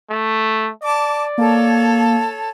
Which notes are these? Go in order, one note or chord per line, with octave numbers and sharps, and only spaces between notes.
A3
D5 A5 D6
A#3 A4 C#5 A5